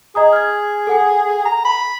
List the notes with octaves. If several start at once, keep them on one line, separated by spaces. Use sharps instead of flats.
G#4 D#5 A#5 D#6
F6 G#6
A4 F#5 G#5
A#5
B5